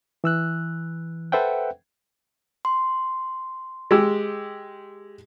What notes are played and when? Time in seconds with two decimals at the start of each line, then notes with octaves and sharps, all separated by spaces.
0.24 E3 E6 F#6
1.32 A4 B4 C5 E5 F#5 G5
2.65 C6
3.91 G#3 G4 E6